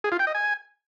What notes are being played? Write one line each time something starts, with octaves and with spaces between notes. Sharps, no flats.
G#4
F4
G5
D#5
G#5